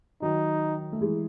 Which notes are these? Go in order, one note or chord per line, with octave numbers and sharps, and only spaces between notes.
D#3 F#3 D#4
A3
E3 G#3